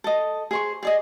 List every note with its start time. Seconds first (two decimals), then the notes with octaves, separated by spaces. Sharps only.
0.04 A4 D#5
0.51 G#4 C5 C#6
0.83 G#4 D5 D#5